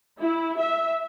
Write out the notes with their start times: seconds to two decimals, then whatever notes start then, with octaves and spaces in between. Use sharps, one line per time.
0.20 E4
0.61 E5